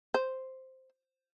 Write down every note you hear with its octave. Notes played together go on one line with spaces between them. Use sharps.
C5